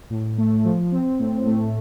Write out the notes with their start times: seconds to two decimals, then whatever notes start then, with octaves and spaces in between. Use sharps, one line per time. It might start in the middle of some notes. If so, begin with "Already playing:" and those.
0.10 A2
0.38 A3
0.64 F3
0.92 C4
1.19 A2
1.46 A3